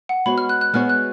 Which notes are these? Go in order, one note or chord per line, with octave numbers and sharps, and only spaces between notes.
F#5
G#3 B3 F#4 C#5 B5
F6
F#6
F#6
G#3 B3 F#4 C#5 F6
F#6